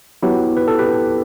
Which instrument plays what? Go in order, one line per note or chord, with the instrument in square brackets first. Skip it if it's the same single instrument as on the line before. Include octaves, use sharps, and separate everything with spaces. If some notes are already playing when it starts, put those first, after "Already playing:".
[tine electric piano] F#3 B3 E4 G4
B4
A4
G4 B4